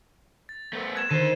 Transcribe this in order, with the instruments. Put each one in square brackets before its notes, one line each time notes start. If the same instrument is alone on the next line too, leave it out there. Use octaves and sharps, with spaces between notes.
[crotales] A6
[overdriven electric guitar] A3 B3
[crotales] F#6 G#6 E7
[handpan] D3 D#3 [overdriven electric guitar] A4 C5 [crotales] D#7